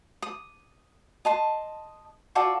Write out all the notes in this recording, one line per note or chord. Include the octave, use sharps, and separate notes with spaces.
D#6
D#5 A5 C6
F4 F#4 A4 D5